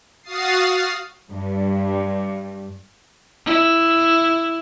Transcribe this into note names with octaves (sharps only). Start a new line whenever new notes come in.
F#4 F5 D#6 A6 C7
F6
G2
E4